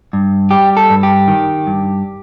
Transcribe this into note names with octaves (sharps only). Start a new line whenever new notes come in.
G2
G3 G4
A4
G2
G4
D#3
G2